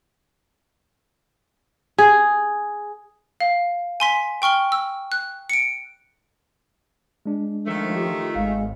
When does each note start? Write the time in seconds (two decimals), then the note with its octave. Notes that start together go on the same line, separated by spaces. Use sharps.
1.98 G#4
3.40 F5
4.00 G#5 C6 B6
4.42 G5 C#6 F6 G7
4.72 E6
5.12 F#6
5.49 C#7 D7
7.26 G#3 D4
7.66 D#3 F3 A3
7.96 F4 G4
8.35 G#1 G#3 F5